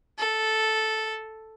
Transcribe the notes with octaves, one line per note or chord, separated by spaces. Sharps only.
A4